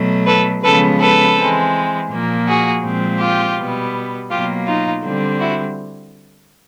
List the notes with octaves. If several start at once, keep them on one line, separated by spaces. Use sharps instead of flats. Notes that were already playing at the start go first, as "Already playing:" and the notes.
Already playing: B2 F#3 A3
A4 B4
C#3 F3 G#3 B3 A4 B4
A4 B4
E3 G#3 C4
A#2 F3 A#3
F#4 G#4
A#2 F3 G#3 C4
F4 G4
B2 G3 B3
B2 F#3 A#3 F4 G4
D#4 F4
D3 G3 C4
E4 F#4